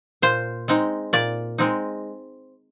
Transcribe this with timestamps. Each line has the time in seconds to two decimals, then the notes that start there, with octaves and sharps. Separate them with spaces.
0.22 A#2 C5
0.68 G#3 C4 D#4
1.13 A#2 D5
1.58 G#3 C4 D#4